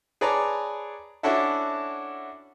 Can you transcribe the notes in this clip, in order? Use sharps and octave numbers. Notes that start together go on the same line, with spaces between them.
G#4 B4 C#5 D5 A5 A#5
C#4 D4 E4 F#4 A4 E5